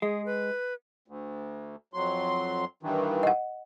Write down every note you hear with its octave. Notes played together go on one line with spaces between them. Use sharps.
G#3 G#4
B4
D2
F2 F#3 C6
G2 D#3 E3
D#5 F#5